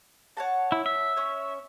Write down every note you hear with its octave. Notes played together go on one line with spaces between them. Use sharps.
C#5 F#5 A5
E4
E5
C#4 C#5